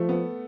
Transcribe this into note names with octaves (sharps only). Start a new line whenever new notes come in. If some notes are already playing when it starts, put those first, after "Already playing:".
Already playing: F3 A3
B3